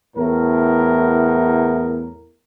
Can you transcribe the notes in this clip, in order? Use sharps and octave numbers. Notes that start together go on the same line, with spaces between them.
E2 A2 A#4